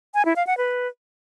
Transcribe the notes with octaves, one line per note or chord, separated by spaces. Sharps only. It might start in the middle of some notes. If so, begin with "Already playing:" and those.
G#5
E4
F5
F#5
B4